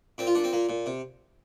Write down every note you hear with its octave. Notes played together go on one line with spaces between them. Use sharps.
A#2 C4
F4
A#2 D4
C4
A#2 A#3
A#2
C3